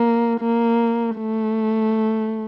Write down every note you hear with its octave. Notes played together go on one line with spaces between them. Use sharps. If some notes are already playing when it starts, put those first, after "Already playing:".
Already playing: A#3
A#3
A3